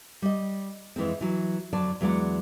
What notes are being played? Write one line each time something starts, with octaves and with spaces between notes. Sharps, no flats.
G3 D#5
F2 E3 G#3 C4
E3 F#3
F2 D3 F#3 D5 A5
E2 F#3 G#3 A4 D5 F#5